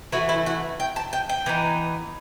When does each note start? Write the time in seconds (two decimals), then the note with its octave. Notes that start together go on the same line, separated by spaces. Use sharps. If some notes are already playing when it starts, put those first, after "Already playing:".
0.12 E3 A3 E4 F#4
0.29 E4
0.46 F#4
0.80 G5
0.96 A5
1.13 G5
1.29 G5
1.46 E3 B3 D#4